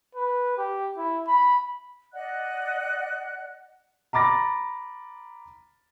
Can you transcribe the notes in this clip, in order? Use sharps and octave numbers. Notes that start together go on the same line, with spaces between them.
B4
G4
E4
B5
D5 D#5 F#5 F#6
A#5 B5 D6 A6 A#6